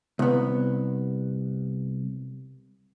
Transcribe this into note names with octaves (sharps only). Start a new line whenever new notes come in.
C2 B3